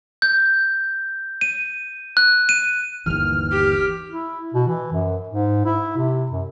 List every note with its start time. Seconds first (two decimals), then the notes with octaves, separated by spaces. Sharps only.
0.22 G6
1.41 D#7
2.17 F#6
2.49 D#7
3.06 G1 D#2 E3 F6
3.51 G4
4.10 E4
4.54 B2
4.67 E3
4.92 F#2
5.29 G#2
5.65 E4
5.97 C3
6.32 F#2